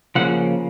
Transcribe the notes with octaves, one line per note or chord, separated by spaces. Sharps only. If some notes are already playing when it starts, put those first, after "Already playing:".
C#3 F3 A#3 C#4 F#5